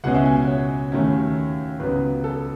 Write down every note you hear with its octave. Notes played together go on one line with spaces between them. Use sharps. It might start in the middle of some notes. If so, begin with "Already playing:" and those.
C#2 B2 G#3 C#4 F#5
E5
G#5
G#5
C#5
D#2 D#3 F#3 A3 C#4
C#2 C#3 F#3 B3 B4
A4